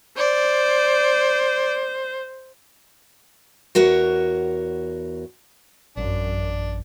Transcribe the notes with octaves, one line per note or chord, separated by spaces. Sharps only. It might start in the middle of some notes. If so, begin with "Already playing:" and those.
C5 D5
E2 F#4 A#4 C#5
A1 F#2 D4